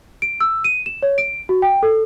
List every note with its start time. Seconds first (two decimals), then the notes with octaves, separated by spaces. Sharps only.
0.22 D7
0.40 E6
0.64 D#7
0.86 E7
1.03 C#5
1.18 D7
1.49 F#4
1.62 G5
1.83 A4